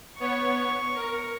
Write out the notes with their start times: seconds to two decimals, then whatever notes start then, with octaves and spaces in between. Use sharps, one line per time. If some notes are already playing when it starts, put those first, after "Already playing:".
0.20 B3 C#5 C#6
0.95 A#4